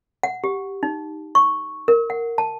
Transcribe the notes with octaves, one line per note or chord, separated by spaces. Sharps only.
F#5
G4
D#4
C#6
A#4
F#5
A5